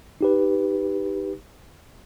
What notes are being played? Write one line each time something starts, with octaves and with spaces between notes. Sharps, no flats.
D#4 G4 B4